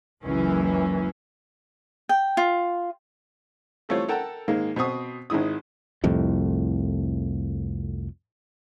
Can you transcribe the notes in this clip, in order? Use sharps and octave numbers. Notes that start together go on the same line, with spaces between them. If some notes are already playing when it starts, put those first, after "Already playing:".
F#1 C#2 F#2 E3 C#4
G5
F4
E3 G3 A3 C4 F4 C#5
A4 A#4 F#5 G5 A5
G#2 D#3 G#3 A#3
B2 C4 C#6 D#6
G#1 D#3 G#3 E4 D#6
C2 F2 A2